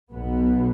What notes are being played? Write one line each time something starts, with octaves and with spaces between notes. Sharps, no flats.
B1 B2 B3